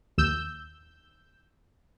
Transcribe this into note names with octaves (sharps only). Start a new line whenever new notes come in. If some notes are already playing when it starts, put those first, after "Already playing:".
D#2 E6 G6